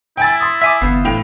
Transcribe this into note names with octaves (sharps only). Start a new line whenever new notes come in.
E4 G5 G#5 A6
C6 D#6
E5 G#5 D6
G1 E3 B3 C5 F5
A2 G5 F7